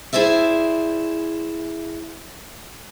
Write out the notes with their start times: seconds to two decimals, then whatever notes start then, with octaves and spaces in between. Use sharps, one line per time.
0.13 E4 G#4 C5 D5 E5